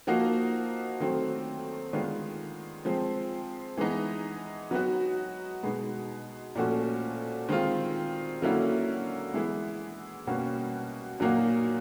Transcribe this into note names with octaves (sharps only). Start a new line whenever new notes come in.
F3 A#3 D#4 F#4
D#3 F#3 A3 C4
D#3 G#3 B3 D4 F4
F3 G#3 C4
E3 G#3 B3 D#4
F#3 B3 D#4 F#4
B2 G#3 B3 D#4
A#2 F3 A3 C#4 F#4
D#3 G#3 C4 F4
D3 F#3 A#3 C#4 E4
E3 G#3 B3 E4
B2 G3 A#3 C#4 F#4
A#2 F#3 A#3 D#4 F#4